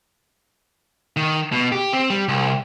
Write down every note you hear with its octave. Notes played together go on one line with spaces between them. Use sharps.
D#3
B2
G4
C4
G3
C2